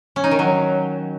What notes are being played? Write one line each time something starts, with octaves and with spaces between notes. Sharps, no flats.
C#4
D#4
D#3
F#3